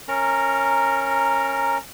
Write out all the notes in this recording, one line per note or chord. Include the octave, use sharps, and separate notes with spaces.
C#4 A#4 A#5